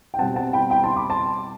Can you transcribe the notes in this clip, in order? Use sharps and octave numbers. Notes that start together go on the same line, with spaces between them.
G5
B2 G3 C4 F#5 A5
F#5 A5
G5 B5
G5 B5
A5 C6
B5 D6
A5 C6